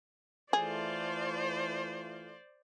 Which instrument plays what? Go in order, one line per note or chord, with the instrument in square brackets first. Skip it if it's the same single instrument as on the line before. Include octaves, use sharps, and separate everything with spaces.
[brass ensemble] E3 A3 F4 [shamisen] G#4 [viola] C5 D5